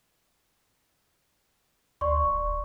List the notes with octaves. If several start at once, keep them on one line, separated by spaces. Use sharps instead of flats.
D2 D5 C6 C#6
D#1